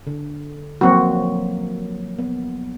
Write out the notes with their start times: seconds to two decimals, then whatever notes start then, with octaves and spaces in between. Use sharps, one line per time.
0.07 D3
0.81 F3 F#3 A#3 C4 F#4
2.19 B3